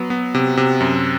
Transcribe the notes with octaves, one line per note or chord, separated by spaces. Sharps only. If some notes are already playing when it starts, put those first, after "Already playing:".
Already playing: F#3 B3
B3
C3
C3
F#2